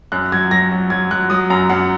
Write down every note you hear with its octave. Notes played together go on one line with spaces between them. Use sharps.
F#2 F#6
F#3 G#6
F#3 A#6
F#3
F#3 G#6
F#3 F#6
F#3 D#6
F#2 A#5
F#2 F#5